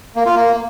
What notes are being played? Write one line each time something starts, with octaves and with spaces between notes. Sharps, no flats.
A#3
F4
A#3